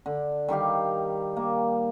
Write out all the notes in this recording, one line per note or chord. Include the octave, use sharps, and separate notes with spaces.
D3
D#3 G3 G4 F5
A#3